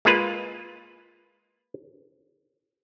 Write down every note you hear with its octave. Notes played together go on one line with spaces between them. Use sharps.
G#3 A#3 F4 B4